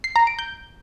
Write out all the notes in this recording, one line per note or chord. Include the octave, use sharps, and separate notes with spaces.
C7
A#5
D7
G6